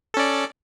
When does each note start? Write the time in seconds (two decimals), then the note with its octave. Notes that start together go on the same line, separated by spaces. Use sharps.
0.14 A4
0.17 C#4
0.19 D5